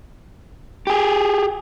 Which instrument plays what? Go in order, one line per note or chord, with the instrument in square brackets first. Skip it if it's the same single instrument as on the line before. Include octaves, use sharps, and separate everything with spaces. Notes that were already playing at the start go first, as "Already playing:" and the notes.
[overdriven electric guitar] G4 G#4